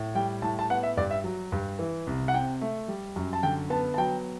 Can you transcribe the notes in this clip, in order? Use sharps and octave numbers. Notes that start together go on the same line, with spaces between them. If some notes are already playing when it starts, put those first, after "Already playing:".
Already playing: A2
G3 G5
A2 A5
A5
B3 F#5
E5
G2 D5
E5
F#3
G2
E3
C2
F#5
C3 G5
A3
G3
F#2
A5
D3 G5
B3 A5
A5
F#3 G5